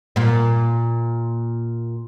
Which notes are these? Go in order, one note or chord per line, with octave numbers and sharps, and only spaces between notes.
A#2 A#3